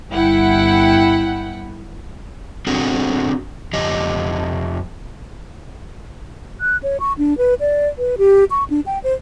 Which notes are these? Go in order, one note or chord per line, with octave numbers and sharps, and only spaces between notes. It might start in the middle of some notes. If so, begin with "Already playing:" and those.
G1 E4 F#5 G5
C4 D4 F#4 G#4 A4
F2 G4 D#5
F#6
C#5
C#6
D4
B4
D5
B4
G4
C#6
D4
G5
C5